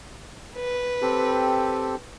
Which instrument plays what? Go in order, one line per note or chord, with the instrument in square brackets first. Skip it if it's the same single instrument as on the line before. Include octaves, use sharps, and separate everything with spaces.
[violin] B4
[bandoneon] C4 G4 A4